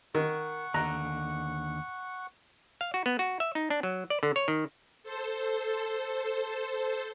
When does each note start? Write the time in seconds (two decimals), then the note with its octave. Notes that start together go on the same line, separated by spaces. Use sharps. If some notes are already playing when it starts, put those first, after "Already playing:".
0.15 D#3 F#5 C#6
0.74 D#2 D3 A#5 F#6
2.81 F5
2.94 F#4
3.06 B3
3.19 F#4
3.40 E5
3.55 D#4
3.70 D4
3.83 F#3
4.10 D5
4.23 D3
4.36 C#5
4.48 D#3
5.03 A4 C5